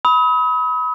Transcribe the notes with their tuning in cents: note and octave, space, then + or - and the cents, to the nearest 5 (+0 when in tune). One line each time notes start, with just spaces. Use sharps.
B5 +0 D#6 +40